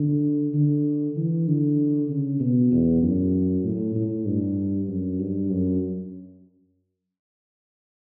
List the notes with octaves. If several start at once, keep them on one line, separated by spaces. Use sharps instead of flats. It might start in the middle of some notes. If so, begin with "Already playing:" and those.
Already playing: D3
D3
E3
D3
C#3
B2
E2
F#2
A2
A2
G2
F#2
G2
F#2